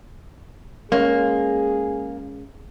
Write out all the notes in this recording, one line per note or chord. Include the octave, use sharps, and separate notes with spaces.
G#3 A#3 C#4 G#4